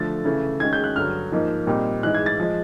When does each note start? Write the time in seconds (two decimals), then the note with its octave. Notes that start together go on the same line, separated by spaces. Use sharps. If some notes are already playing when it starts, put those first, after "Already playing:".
Already playing: D3 F3 A3 A6
0.25 C#3 E3 A3
0.60 D#3 G#3 C#4 G#6
0.73 G6
0.84 F#6
0.96 G2 D3 F#3 F6
1.32 G#2 F3 A#3 D#4
1.67 A#2 G3 C4 D#4
2.03 G#2 E3 G#3 F#6
2.15 G#6
2.26 A6
2.39 F3 G#3